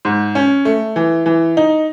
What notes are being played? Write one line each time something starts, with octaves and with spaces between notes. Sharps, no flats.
G#2
C#4
A3
E3
E3
D#4